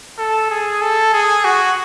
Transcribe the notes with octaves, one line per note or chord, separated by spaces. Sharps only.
A4
G#4
A4
G#4
F#4